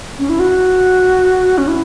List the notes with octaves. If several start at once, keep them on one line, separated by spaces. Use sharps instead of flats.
C#4
E4
F#4
C#4
E4